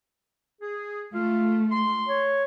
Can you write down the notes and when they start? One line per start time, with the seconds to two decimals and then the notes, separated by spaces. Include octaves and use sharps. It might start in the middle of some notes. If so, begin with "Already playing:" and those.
0.61 G#4
1.14 A3 F4 F5
1.71 C6
2.08 C#5